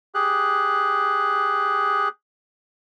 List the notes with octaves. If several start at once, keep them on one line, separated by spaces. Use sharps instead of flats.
G4 G#4 F#6